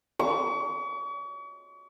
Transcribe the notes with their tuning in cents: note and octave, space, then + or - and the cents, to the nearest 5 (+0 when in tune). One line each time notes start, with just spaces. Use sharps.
C#6 +40